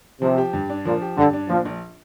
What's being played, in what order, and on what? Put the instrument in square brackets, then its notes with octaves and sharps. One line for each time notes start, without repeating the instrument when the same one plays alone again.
[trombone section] C3 [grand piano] F3
[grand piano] G4
G2
D4
[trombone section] A#2 [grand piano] F3
[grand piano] G4
[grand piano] G2 [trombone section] D3
[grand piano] D4
[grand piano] A#2 [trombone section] F3
[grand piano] A#1